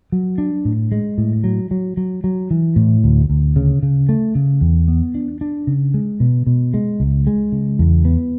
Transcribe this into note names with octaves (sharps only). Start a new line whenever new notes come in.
F#3
D4
A2
G#3
A2
F#3
F#3
F#3
F#3
E3
A2
D2
D2
C#3
C#3
A3
C#3
E2
B3
D4
D4
C#3
G#3
B2
B2
G#3
C#2
G#3
C#3
E2
B3